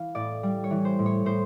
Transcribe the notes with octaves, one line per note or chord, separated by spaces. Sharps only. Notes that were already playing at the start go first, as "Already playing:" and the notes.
Already playing: E3 F5
A2 D5
G3
C#5
E3
C5
A2
C#5
A2 C5